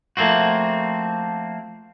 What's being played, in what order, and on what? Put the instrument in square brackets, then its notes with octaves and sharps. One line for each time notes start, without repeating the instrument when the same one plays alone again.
[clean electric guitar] F3 A3 A#3 C4 F#4